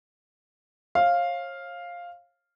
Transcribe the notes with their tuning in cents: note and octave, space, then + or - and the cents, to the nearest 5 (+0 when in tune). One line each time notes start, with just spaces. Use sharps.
C#5 -40 F5 +0